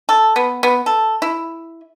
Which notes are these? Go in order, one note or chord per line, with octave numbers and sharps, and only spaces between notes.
A4
B3
B3
A4
E4